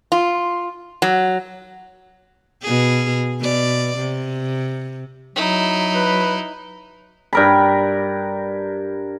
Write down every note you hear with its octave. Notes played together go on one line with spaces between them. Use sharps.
F4
F#3
B2 G#4
B2 D5
C3
F#3 D#4 E4
B4
G2 A#4 B5